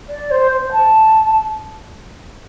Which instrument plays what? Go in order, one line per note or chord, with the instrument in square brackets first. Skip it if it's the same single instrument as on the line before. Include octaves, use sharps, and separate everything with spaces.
[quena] D5
C5
C5
A5